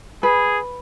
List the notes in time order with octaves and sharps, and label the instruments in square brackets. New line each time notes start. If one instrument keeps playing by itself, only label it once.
[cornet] G#4 [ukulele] B4